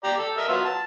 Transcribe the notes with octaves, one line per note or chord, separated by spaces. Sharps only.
G4 D5 A#5
A4
A#4 D#5 E5
F#3 B3 F4
A5